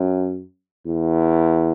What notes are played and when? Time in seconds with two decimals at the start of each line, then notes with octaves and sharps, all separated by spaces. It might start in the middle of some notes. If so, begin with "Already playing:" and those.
Already playing: F#2
0.87 E2